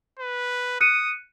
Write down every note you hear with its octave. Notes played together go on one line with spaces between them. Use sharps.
B4
D#6 F#6 C#7 D#7